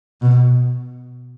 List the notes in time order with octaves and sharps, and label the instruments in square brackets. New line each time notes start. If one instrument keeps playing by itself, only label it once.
[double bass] B2